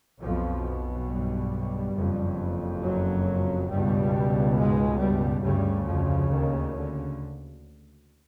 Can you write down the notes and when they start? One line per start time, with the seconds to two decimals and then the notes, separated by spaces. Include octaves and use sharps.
0.21 B1 F2 B2 F3
1.08 G2 G3
1.95 F#1 F2 C#3
2.81 F#2 F#3
3.69 C#2 G2 B2 G3
4.56 G#2 G#3
4.99 G2 G3
5.43 D2 G2 C#3 G3
5.86 F2 F3
6.30 D#2 D#3
6.74 D3